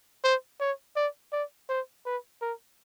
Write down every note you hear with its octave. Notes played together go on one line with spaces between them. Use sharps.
C5
C#5
D5
D5
C5
B4
A#4